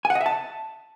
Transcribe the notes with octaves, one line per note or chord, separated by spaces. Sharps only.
G#5
F#5
D#5
E5
A5